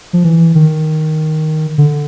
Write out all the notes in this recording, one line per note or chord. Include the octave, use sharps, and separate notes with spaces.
F3
E3
D#3
D3